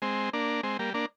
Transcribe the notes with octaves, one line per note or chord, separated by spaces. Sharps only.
G#3 C4
A#3 D4
G#3 C4
G3 A#3
A#3 D4